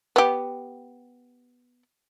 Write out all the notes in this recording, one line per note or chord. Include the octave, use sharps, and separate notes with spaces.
B3 G4